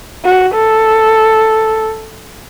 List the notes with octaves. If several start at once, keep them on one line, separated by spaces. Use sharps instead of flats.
F#4
A4